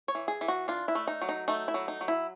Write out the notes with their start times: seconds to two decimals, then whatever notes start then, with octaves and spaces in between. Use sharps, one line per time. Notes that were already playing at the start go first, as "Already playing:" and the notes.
0.08 C#5
0.15 E3
0.28 G#4
0.41 E3
0.48 F#4
0.68 D4 F4
0.88 E4
0.95 A3
1.08 D#4
1.22 F#3
1.29 D#4
1.48 A3 D#4
1.68 E4
1.74 F#3
1.88 D#4
2.01 F#3
2.08 E4